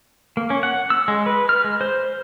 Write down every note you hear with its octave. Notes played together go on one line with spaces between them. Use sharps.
A#3
C#4
F#5
E6
G#3
B4
F6
G#3
C5